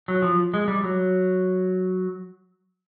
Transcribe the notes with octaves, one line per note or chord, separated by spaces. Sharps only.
F#3
F3
G#3
G3
F#3